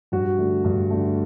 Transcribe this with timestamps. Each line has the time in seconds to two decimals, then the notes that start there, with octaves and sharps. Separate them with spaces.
0.12 G2 F#4
0.38 D3 A3
0.64 G2
0.90 D3 A3